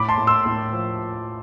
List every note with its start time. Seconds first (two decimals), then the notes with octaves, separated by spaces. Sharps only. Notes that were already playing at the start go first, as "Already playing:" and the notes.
Already playing: A2 B5 D6
0.08 A5 C6
0.18 A2
0.27 C6 E6
0.46 A2
0.73 F3